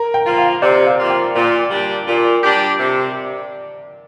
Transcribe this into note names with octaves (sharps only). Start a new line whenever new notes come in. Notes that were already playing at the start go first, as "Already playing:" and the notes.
Already playing: A#4
G5
F3 A#3 F4
F5
C3 D5
F5
F3 A#3 F4
G5
A#2
G3 D4 G4
A#2
G3 D4 G4
C3